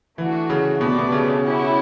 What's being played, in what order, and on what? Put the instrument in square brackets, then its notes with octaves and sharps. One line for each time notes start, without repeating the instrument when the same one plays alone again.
[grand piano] E3 [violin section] A3 D4 F#4
[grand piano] C#3
[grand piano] B2 [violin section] A3 D4 G4 B4 D5
[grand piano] B2
C#3
C#3
[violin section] C#4 E4 G4 C#5 F#5